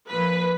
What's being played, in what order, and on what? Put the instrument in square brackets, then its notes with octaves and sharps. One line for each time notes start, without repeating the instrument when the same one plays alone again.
[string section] A#2 F3 B4